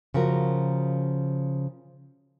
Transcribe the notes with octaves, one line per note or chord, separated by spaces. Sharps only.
C#3 F3 F#4 A#4